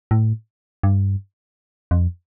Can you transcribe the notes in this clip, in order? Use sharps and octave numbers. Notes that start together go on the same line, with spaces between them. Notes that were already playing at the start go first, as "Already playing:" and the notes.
A2
G2
F2